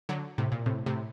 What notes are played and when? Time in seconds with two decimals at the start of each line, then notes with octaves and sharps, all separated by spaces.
0.09 D3 F#3
0.38 A2 C3
0.52 A#2
0.66 A2 C3
0.86 A2 C3